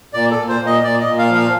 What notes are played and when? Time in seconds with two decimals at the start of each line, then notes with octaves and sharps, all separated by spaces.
0.13 A#2 D5
0.31 A4
0.36 A#2
0.48 C5
0.60 A#2
0.66 D#5
0.84 A#2 D5
1.00 D#5
1.06 A#2
1.18 F5
1.29 F3
1.35 F5